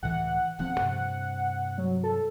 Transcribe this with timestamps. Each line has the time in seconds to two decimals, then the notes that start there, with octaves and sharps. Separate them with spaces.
0.03 C#2 A2 E3 F#5
0.59 D#1 F3 C4 F#5
0.80 G2 C3
1.78 F#3
2.04 A4